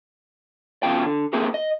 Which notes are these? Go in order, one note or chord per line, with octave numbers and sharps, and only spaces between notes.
E2 B2 C#4 F4 G5
D3
A#3 C4 E4 G4 G#4 A#4
D#5